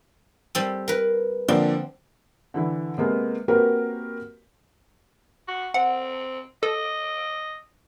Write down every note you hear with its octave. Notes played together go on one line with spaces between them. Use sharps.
G3 C4 A4
A#4 B4
D3 F3 A#3 C4
D3 E3 E4
C3 G#3 A#3 B3
A#3 C4 F#4 G4 A#4 B4
F#4
C4 F#5
A4 D#5